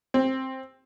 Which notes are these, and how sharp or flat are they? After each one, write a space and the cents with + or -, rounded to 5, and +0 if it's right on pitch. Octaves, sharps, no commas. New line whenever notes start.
C4 +10